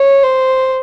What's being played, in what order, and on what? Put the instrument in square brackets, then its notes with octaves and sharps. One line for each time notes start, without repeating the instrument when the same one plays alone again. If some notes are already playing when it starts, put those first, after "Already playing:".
Already playing: [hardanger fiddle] C#5
C5